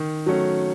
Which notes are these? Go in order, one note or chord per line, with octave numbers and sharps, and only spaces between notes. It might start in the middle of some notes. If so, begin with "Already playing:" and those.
Already playing: D#3
F#3 A3 C#4